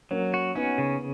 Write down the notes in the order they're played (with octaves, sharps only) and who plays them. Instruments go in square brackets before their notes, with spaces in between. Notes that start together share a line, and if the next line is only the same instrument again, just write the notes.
[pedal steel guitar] F#3 [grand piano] A#3 C#4
[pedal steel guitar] F#4
[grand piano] B3 D#4 [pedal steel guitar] C#4
[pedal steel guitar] C#3